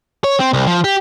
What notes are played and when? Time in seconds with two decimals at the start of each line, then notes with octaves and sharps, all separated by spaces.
0.24 C#5
0.40 C4
0.53 C2
0.67 F3
0.84 G4